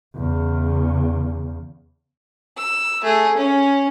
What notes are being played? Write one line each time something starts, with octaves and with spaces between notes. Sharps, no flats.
E2 C#3
E6
A3 G#4
C#4